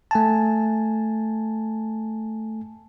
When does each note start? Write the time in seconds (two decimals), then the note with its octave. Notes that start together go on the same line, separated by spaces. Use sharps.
0.11 A3 G#5 A5